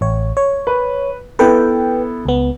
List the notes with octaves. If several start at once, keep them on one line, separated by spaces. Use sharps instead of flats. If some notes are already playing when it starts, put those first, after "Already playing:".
A1 C#5
C#5
B4
B3 E4 A4 B4 G5
C#2 B3